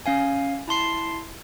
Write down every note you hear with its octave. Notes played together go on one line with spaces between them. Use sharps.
C#4 F5 G#5
E4 A5 C6 C7